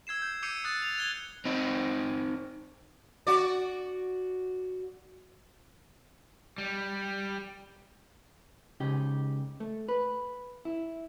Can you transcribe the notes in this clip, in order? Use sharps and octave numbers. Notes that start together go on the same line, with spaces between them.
E6 G#6 C7 E7
G6
D6 E6 G6 C7 C#7 D#7
D#6 F#6 A6 C7
F7
F#6 G#6 C#7 G7
C4 D#4
F#4 D5
G3
C#2 C#3 D#4 G4
A3
B4
E4